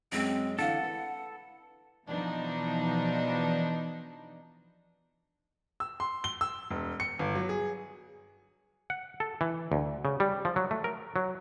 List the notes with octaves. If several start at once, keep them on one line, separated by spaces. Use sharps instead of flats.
F#2 G#3 C4
D3 E3 A4 F5 F#5
B4
B2 E3 F3 D4 D#4
E6
C6
G7
E6
E1
C#7
G1
F#3
G#4
F#5
A4
E3
D2
C#3
G3
F3
F#3
A3
A#4
F#3